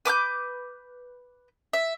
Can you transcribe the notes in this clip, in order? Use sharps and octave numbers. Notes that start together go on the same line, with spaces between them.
B4 D6 F6 G6
E5